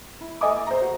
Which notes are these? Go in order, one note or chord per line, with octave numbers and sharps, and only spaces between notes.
E4
A4 D#5 E5 G#5 D6 D#6
C5 A#5
F#4